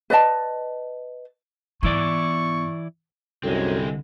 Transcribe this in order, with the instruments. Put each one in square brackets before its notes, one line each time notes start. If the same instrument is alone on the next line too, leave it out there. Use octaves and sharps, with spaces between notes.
[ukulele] B4 D5 D#5 A5
[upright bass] G#2 B3 [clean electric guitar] E3 E4 D5 [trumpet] C#6
[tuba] C2 [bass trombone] F#2 [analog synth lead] D3 [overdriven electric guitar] G#3 C4